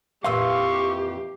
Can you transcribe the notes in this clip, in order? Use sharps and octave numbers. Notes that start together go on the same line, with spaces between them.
F2 A#2 E3 G4 F5 C6 C#6 E6